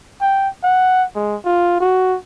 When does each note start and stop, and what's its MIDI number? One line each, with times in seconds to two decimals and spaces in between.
0.22 0.49 79
0.63 1.04 78
1.16 1.36 56
1.45 1.80 65
1.80 2.16 66